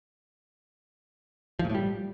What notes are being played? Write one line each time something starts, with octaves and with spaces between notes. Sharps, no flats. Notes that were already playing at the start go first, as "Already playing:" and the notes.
F3
A#2
A2
G3